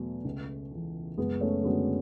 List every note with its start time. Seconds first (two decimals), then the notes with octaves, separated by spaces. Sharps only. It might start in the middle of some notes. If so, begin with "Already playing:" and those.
Already playing: E2 B2 F#3 A3
0.24 C#2
0.72 C#3 E3
1.18 F#1 G#3 B3
1.41 A3 C#4
1.64 F#2 D3 F#3 G#3 B3